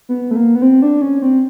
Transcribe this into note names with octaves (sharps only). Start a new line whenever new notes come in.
B3
A3
A#3
B3
C4
D4
C#4
C4